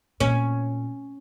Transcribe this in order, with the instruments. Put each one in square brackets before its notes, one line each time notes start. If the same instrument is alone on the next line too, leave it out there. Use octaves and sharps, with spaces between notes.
[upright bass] A#2 [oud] C#4